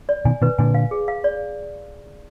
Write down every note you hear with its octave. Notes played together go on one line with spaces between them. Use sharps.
D5
B2 D#3 G#5
B2 D#3 B4
A#2 D3 G#5
F5
G#4
F5
D5